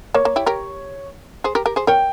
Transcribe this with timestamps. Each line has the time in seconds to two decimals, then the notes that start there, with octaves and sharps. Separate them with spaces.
0.14 A#3 C#5
0.25 A#3
0.36 E4 G4
0.46 G4 A#4
1.44 G#4 C5
1.55 G4 A#4
1.66 G4 A#4
1.76 G#4 C5
1.87 A#4 C#5 G5